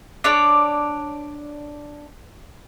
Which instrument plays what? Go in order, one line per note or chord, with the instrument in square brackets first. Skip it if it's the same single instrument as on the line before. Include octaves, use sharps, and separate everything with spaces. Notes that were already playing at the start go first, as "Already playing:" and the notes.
[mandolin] D4 C#5 D5